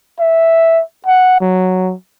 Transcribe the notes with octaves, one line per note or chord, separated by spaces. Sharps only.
E5
F#5
F#3